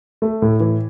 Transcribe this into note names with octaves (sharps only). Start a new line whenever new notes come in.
A3
A2
E3